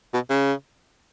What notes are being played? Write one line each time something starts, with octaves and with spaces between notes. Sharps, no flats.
B2
C#3